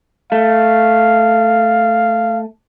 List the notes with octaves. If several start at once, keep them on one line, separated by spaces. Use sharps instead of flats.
A3 F5